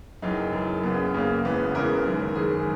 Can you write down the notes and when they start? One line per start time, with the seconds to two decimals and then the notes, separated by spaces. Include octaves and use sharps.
0.22 F#1 F#2 E3 D#4
0.53 F#1 F#2 E3
0.83 F#1 F#2 C#3 B3
1.14 F#1 F#2 C#3 A#3
1.45 E1 E2 C#3 E3 B3
1.74 E1 E2 C#3 E3 A#4
2.06 G#1 F#2 D#3
2.35 G#1 F#2 D#3 G#4